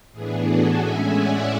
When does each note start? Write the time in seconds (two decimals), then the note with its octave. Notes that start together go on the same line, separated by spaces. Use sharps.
0.12 A2 E3 B3 D4 G#4
0.45 F#4 A4
0.78 A2 G#3 C#4 E5 G#5
1.11 D5 F#5